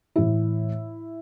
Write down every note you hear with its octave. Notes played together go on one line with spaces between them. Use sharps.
A2 E3 E4